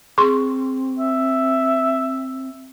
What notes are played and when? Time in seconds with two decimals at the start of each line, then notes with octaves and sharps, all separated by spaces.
0.18 C4 G#4 C6 C#6
0.99 E5